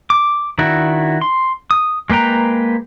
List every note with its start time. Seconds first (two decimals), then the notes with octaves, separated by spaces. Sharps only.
0.10 D6
0.59 D#3 D4 E4 F#4
1.21 C6
1.71 D#6
2.10 G#3 A#3 B4 G5 A#5